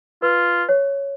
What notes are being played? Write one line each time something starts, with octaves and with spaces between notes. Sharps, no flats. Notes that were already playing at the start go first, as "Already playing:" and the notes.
F4 B4
C#5